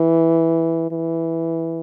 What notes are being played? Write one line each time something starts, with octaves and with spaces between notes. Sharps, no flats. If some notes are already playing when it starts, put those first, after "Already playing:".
Already playing: E3
E3